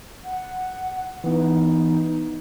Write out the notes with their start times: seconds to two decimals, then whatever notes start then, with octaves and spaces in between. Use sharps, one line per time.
0.24 F#5
1.24 E3 B3 D#4